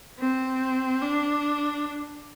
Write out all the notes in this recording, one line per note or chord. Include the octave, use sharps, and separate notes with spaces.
C4
D4